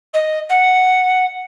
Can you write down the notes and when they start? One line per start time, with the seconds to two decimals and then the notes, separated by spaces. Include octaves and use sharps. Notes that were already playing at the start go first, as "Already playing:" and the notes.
0.13 D#5
0.49 F#5